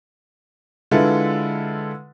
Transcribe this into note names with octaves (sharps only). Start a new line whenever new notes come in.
D3 G#3 E4 F4 A4 B4